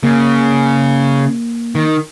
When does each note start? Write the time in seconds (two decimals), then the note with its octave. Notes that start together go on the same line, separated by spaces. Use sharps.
0.03 C#3 A#3
1.75 D#3